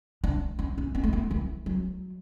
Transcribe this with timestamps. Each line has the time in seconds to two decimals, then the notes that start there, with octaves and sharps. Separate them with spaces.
0.24 D4
0.59 C#4
0.78 C#4
0.95 B3
1.04 A3
1.13 B3
1.31 E3
1.66 F#3